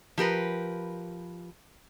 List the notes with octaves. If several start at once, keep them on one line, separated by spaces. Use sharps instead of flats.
F3 G4 A#4 B4